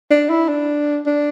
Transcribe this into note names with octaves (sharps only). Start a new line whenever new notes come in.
D4
E4
D4
D4